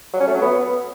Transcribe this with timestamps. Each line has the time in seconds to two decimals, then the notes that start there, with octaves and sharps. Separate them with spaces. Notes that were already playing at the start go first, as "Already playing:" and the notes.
0.13 F#3
0.20 C#4
0.27 A3
0.34 F#3
0.41 B3